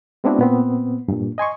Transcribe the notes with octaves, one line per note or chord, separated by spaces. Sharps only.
G#3 B3 C4 D4 E4 F#4
A#2 B3 C4
G2 A#2
D#5 G#5 C6 C#6